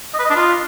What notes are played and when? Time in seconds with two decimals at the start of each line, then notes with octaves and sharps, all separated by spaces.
0.14 D#5
0.19 B4
0.25 D#5
0.30 D4
0.36 F4